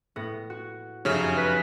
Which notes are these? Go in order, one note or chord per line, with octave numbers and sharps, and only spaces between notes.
A2 B3 A#6
F#4
F1 F#2 C#3 C#4
B4